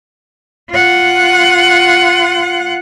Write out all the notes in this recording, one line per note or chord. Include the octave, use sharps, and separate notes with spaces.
F4 F#5